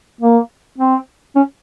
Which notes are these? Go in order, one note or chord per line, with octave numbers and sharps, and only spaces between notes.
A#3
C4
C#4